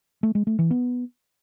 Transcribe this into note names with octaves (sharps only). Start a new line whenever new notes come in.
A3
G#3
A3
E3
B3